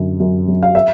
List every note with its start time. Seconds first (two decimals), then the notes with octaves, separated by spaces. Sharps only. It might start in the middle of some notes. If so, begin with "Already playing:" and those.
Already playing: F#2 D3
0.20 F#2
0.48 F#3
0.63 F5
0.75 E5